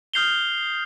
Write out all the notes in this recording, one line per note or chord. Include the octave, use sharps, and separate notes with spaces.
D#6 F6 G6 C7 F7 G7